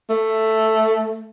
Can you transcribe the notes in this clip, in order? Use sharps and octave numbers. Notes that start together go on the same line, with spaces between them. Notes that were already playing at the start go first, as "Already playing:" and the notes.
A3